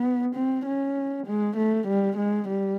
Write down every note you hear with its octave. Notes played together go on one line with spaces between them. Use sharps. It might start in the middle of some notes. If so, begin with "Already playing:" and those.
Already playing: B3
C4
C#4
G#3
A3
G3
G#3
G3